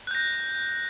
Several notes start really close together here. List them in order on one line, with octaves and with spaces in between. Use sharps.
F#6 G6 A#6